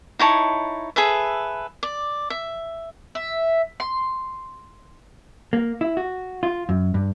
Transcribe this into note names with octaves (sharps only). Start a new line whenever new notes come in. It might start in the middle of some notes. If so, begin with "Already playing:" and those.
D#4 E4 C#5 A5
G#4 A4 B4 E5
D5
E5
E5
C6
A#3
E4
F#4
F4
F#2
G2